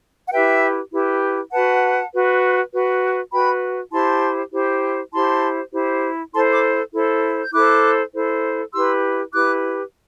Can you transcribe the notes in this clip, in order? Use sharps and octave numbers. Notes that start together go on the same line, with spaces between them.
F#5
E4 G4 B4 E5 G5
E4 G4 B4
F#4 B4 F#5 A5
F#4 B4
F#4 B4
F#4 B4 G5 B5
E4 G4 C5 A5 C6
E4 G4 C5
E4 G4 C5 A5 C6
E4 G4 C5
E4 A4 C5 A5 C6
B5 D6
E4 A4 C5
G6
E4 A4 C5 D6 F#6
E4 A4 C5
E4 G4 B4 C6 E6
E4 G4 B4 D6 F#6